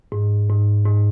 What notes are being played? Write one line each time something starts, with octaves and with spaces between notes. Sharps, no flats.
G#2
G#2
G#2